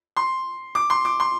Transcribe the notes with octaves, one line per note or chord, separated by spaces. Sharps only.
C6
D6
C6
D6
C6